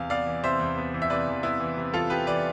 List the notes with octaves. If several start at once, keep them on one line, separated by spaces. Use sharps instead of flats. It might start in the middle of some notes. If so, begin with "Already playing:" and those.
Already playing: E2 C3 F5
B3 D5 F5
E3
C3 C5 E5
E2
B3
E3
E5
C3 B4 D5
E2
B3 E4
E3
C3
E2 F4 A4
B3 G4 B4
E3 B4 D5